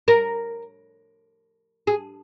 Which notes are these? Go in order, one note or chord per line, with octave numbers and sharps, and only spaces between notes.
A#4
G#4